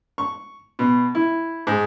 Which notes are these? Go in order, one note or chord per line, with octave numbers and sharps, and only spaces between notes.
C#6
B2
E4
G#2